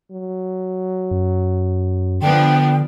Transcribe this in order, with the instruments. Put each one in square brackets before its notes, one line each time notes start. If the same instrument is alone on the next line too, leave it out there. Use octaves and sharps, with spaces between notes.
[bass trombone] F#3
[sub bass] F#2
[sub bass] D3 [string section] F3 B3 D4 [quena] G5